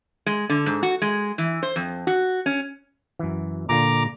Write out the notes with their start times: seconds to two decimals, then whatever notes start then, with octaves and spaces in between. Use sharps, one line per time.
0.26 G#3
0.50 D3
0.66 G#2
0.83 F#4
1.02 G#3
1.38 E3
1.63 C5
1.76 F2
2.07 F#4
2.46 C#4
3.19 F#2 E3
3.69 A#2 D3 F4 A#5 D6